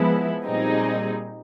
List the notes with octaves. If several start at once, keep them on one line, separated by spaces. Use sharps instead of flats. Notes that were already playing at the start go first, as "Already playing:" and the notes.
Already playing: F3 G#3 B3 E4
A#2 G3 C4 D#4 G#4